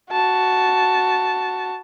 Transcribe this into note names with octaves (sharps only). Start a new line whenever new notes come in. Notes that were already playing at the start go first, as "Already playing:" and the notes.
F#4 A5